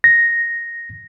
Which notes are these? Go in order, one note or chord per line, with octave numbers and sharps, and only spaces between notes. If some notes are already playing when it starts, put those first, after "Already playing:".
A#6